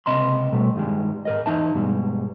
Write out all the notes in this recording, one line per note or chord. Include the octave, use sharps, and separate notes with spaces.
C#2 C3 D#5 B5 C6
B2 G3 A3
G2 D#3 G3 G#3
G#2 A#4 D#5
E2 D#4 E5 A5
G2 B2 G3 G#3